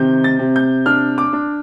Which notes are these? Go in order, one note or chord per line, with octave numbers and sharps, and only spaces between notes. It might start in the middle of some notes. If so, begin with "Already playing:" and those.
Already playing: C3 D#3 G6
A6
C3
G6
D4 F6
D6
D4